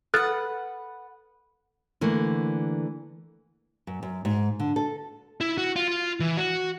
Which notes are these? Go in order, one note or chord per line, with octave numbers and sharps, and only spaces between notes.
A4 B4 F#5 F6 F#6 A6
D3 E3 A3 A#3
F#2
F#2
G#2
D3
A4
E4
F#4
F4
F4
E3
F#4